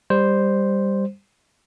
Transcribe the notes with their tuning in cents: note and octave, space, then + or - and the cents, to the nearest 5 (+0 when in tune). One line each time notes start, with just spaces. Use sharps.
G3 +15 C5 +0